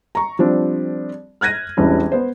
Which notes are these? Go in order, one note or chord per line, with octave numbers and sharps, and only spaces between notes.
A#5 C#6
F3 G3 C4 D4
F6 F#6 G#6 A#6 D#7
E1 A1 G3 E4
B3 C5